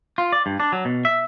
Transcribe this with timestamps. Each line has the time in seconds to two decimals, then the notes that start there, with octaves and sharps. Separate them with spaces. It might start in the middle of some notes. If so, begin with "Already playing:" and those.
0.18 F4
0.32 D5
0.46 G2
0.60 D4
0.72 F#3
0.85 B2
1.05 E5